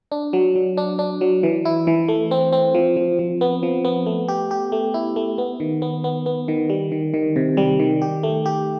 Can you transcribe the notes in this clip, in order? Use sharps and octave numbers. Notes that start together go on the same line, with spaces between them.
D4
F#3
F#3
D4
D4
F#3
E3
E4
E3
A3
C4
C4
F3
F3
F3
B3
F3
B3
A3
G4
G4
A3
E4
A3
B3
D#3
B3
B3
B3
D#3
G3
D#3
D#3
C3
G3
D#3
G4
A3
G4